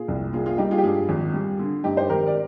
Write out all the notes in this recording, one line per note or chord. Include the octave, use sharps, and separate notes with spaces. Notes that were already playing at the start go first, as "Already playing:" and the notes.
Already playing: A#2 F4 G#4
C2
A#3 F4 G#4
F4 G#4
G3 D#4 G4
F4 G#4
G4
G2 F4 G#4
G#1
G3
D3
G2 D#4 G4
C5
G#1 G4 A#4
D5